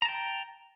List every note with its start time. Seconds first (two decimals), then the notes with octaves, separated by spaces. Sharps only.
0.02 A#5
0.05 A5
0.09 G5